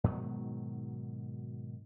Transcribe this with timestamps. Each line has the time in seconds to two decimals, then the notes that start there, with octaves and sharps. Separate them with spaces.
0.04 G#2 B2 D#3 F#3